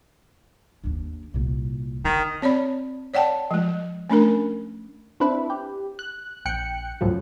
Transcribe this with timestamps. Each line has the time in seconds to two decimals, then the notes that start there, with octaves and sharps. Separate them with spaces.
0.84 D#2 D4
1.34 C2 A#2
2.05 D3 D#3
2.42 C4 C#5 D5 B5
3.14 C#5 D5 F#5 G5 A5
3.51 F3 G#3
4.10 A3 C#4 D4 A#4
5.20 C4 D4 E4 B4
5.50 G4
5.99 F#6
6.45 A#1 G5 F#6 C#7
7.01 G1 C#2 F#2 A2 F3 F#3